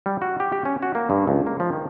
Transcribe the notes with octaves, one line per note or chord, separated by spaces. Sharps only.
G3
F#4
G4
G4
C#4
F#4
A#3
G2
C#2
A#3
F3
D#3